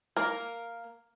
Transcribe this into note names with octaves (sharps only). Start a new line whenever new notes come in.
A#3 A#4